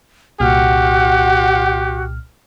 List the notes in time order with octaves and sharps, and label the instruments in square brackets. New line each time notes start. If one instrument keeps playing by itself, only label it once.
[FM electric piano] C2 A#2 F6 [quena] F#4 [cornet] G4 [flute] F#5